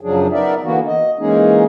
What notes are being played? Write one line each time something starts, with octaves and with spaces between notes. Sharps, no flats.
F#2 C#3 F3 F#3 D4 G#4
B3 D#4 A#4 D5 E5
D3 E3 A#3 B3 F#4
D#5
E3 G#3 A#3 C#4 D#4 G#4